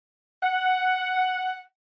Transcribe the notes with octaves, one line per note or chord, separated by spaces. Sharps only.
F#5